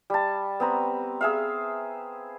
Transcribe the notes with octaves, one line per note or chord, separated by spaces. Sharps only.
G3 A5
B3 C4 A#5
G#4 E5 F5